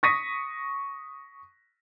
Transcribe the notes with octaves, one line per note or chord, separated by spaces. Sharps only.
C#6 D#6 A#6 B6 D#7